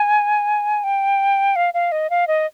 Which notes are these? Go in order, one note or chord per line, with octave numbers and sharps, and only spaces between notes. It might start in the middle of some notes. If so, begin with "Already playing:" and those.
Already playing: G#5
G5
F5
F5
D#5
F5
D#5